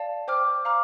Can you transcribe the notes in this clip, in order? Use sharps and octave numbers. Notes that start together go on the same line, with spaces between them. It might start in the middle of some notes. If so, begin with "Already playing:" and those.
Already playing: D5 F5 A5
C5 G5 D6 F6
F5 A#5 D6 F6